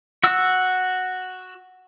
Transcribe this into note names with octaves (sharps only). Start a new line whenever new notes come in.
F#4 E6